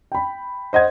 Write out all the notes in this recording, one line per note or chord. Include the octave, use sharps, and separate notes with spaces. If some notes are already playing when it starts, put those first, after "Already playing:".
G5 B5
C5 D#5 F#5 G#6